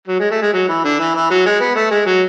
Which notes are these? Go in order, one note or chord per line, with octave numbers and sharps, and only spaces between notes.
F#3
G#3
A3
G#3
F#3
E3
D3
E3
E3
F#3
G#3
B3
A3
G#3
F#3